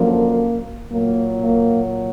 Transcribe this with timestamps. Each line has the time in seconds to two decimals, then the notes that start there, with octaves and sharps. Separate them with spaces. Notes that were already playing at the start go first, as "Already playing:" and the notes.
Already playing: F#2 D3 F3 A#3
0.90 A#2 F#3 A#3
1.42 A#3